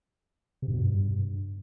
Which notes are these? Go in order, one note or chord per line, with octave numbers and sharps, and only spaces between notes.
C3
G2
B2
G2